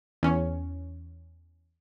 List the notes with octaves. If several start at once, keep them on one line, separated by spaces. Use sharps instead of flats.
E2 C#4